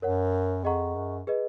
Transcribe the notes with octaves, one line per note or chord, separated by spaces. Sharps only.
F#2 A#4 C#5 F#5
F2 G#4 D#5 F#5 A#5 C#6
F#2
G#4 B4 D#5